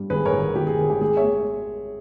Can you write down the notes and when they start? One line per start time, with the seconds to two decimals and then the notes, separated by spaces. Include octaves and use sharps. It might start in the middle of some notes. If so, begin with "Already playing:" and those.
Already playing: G2 G3
0.10 G#1 G#4 B4
0.25 A#4 C#5
0.33 G#1
0.55 G#1 G4 A#4
0.67 G#4
0.79 G#1
0.90 G4
1.01 G#3 G#4
1.17 C#5 E5
1.24 G#3